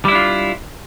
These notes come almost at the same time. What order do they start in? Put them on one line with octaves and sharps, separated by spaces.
G3 E4 D4 F4